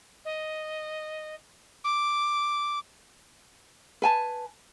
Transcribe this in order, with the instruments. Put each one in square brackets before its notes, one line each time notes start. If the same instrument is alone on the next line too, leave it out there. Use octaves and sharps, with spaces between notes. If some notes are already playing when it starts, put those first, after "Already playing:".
[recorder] D#5
D6
[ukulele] B4 G#5 A5